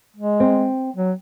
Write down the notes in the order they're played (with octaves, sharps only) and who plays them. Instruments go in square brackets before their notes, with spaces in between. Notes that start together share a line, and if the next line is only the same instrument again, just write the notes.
[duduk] G#3
[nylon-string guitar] C4
[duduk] F#3